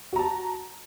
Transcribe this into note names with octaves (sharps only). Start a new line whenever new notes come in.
F#4 A5 A#5